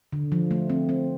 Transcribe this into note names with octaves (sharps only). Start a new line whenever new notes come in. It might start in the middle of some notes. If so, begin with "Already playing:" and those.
D3
F3
A3
C4
C4